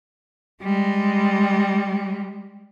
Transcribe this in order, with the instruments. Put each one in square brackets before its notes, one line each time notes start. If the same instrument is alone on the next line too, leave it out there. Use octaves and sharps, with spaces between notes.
[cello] G3 G#3